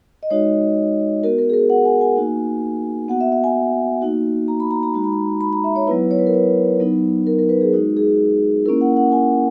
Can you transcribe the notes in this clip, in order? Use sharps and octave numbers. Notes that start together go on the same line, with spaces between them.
D#5
G#3 D#4 F#4 C#5
B3 F#4 A#4
A#4
G#4
A#4
F#5
G#5
G#5
A#3 D#4 F#4
B3 F#4 F#5
E5
E5
G#5
A#3 D#4 F#4
A#5
B5
A#5
A#5
G#3 D#4 F#4 A#5
B5
A#5
B5
A#5
E5
C#5
F#3 B3 E4 B4
C#5
B4
A#4
B4
F#3 B3 D#4
A#4
A#4
B4
G#4
G#3 D#4 F#4
G#4
A#3 C#4 E4 A#4
F#5
F#5
G#5